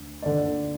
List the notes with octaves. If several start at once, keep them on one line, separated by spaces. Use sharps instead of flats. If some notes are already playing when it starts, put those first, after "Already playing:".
Already playing: D2 D3
D3 D5